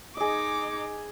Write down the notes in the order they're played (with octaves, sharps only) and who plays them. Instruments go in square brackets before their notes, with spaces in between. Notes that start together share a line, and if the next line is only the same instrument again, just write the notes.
[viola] D#4 D6 [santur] G#4 D#5